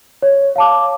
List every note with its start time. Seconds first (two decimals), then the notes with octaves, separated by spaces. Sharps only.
0.22 C#5
0.56 F5 A5 D6